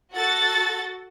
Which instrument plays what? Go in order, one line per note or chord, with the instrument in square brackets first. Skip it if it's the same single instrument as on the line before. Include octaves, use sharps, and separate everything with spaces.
[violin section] F#4 A4 F#5 A6